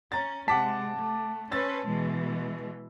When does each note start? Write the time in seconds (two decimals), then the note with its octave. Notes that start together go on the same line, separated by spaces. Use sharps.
0.12 C#4 A#5 A6
0.48 C3 G#3 F#5 A5 D6 B6
0.96 A3
1.52 C#4 B4 C5 E6 A6
1.87 B2 E3 G#3